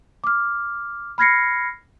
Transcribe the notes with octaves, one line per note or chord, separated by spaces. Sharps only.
D6 F6
B5 F6 G#6 A#6 C7 C#7